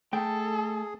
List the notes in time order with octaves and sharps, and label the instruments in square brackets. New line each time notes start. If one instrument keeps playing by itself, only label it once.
[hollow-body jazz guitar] A3 G5 [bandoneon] G#4 [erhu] A4